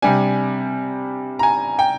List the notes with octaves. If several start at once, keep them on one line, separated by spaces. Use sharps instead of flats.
C3 G3 D4 G#5
A#5
G#5
G5